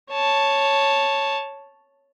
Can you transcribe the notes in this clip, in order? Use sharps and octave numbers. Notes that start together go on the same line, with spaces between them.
C#5 A5